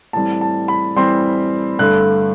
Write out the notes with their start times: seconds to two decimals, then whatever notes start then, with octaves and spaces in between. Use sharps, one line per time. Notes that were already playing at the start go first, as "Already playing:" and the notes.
0.13 A2 E3 G3 C4 A5
0.41 A5
0.68 B5
0.96 A2 E3 G3 C4 C6
1.79 G2 D3 A3 F#6